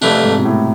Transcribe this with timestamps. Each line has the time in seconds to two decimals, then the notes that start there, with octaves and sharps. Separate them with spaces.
0.01 F2 C3 E3 A3 D4
0.23 G#2
0.39 B2
0.45 A2